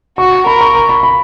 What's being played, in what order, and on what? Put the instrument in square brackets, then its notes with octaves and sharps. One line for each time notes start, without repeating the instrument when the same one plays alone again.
[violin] F#4 [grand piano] C#6
[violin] A#4 [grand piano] B5
[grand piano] C#6
C#6
B5
B5